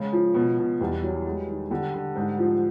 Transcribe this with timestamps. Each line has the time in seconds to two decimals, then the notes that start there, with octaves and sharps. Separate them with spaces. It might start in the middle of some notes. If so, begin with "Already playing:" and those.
Already playing: C#3 G#3
0.13 F3
0.34 B2
0.58 B2
0.80 E2 G3
1.03 F#3
1.26 G#3
1.47 D#3
1.70 D3 G3
1.94 D3
2.16 G#2
2.39 F3